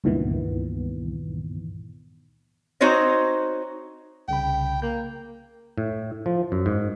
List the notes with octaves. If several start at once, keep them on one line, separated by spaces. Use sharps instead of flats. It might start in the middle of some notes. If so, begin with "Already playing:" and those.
C#2 G2 A#2 D#3 E3 B3
C4 D#4 F#4 C5 C#5 D#5
C2 C#3 G5 B5
A#3 G6
A2
F3
F#2
G#2